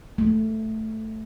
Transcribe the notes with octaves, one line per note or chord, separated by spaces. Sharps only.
A3